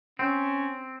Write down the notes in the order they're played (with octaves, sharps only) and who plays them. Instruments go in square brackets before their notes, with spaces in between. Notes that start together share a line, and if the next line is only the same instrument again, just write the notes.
[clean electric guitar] C4 [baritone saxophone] C#4